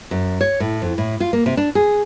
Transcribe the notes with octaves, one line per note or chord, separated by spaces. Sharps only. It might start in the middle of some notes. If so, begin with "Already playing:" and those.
F#2
C#5
A2
F2
A2
F4
A#3
C3
D4
G#4